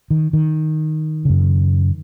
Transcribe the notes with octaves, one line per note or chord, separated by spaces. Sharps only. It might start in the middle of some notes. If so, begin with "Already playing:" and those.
D#3
D#3
F#2 C#3